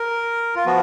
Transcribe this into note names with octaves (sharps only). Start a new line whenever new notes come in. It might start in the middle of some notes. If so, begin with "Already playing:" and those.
Already playing: A#4
F4
F3 B3 F#4